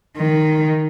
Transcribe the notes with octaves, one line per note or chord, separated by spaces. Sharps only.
D#3